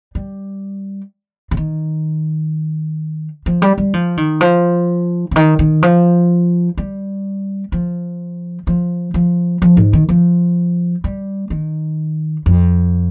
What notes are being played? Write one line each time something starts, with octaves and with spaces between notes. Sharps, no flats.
G3
C#3
D#3
F3
G3
G3
F3
D#3
F3
C#3
D#3
D#3
F3
G3
F3
F3
F3
F3
G#2
D#3
F3
G3
D#3
F2